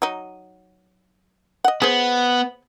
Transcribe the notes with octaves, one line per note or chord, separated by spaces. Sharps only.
F#3 D#4
D#5 F#5
B3 G#4 C5